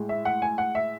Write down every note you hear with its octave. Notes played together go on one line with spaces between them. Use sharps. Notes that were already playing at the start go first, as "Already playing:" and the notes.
Already playing: A2 G#3
E5
F#5
G#5
F#5
E5